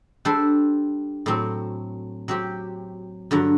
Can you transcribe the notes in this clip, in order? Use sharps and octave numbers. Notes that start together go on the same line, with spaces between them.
G3 D4 A4 C5
A2 F#3 C4
F#3 C4 G4
G2 D3 F#3